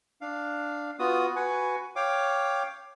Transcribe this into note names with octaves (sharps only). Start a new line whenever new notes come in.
D4 F5
B3 F4 F#4 D#6
F#4 B4 F#5 G#5
C#5 F5 G5 D6